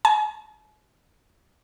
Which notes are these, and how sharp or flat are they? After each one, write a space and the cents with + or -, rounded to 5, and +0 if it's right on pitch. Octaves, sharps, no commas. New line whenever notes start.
G#5 +45